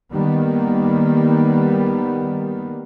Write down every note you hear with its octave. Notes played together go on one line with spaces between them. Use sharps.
D#3 G3 A#3 B3